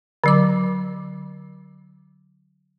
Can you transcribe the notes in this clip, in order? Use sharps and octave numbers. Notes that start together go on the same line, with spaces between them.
D3 F#3 D6